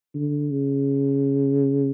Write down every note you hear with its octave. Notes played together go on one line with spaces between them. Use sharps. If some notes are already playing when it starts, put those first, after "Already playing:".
D3
C#3